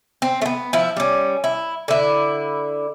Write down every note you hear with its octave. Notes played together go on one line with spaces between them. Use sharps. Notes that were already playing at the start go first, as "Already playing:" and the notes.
C4
A3 B3
F3 E4
G3 C#4
E4
D3 E4